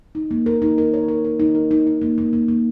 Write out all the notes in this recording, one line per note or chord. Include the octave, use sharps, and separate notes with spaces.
D#4
A#3
A#4
D#4
A#4
C#5
A#4
A#4
D#4
A#4
D#4
D#4
A#3
A#3
A#3
A#3